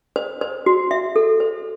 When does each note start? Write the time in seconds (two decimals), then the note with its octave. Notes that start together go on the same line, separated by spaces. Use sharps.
0.16 C5
0.41 C5
0.66 F#4
0.91 E5
1.16 A4
1.40 C5